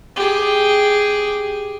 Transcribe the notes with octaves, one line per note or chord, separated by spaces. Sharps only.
G4 G#4